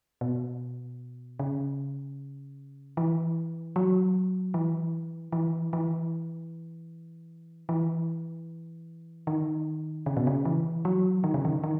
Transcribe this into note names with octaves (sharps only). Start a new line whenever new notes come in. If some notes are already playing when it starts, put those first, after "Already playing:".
B2
C#3
E3
F#3
E3
E3
E3
E3
D#3
C#3
B2
C#3
E3
F#3
D#3
C#3
D#3
D#3